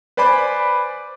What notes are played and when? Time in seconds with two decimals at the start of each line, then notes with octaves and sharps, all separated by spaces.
0.17 B4 C5 D5 G#5 B5 D6